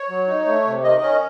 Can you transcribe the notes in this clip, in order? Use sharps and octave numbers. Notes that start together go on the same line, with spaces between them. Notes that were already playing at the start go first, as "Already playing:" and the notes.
Already playing: C#5
F#3
D#4
A3
C3
D#3 D#5
C#4